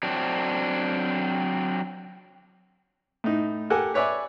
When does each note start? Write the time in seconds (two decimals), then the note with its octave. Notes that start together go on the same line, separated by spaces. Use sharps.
0.03 F#3 C4 D4
3.24 A2 D#4
3.70 G4 A4 A#4 F#5 G#5
3.94 B4 C#5 D5 E5 G#5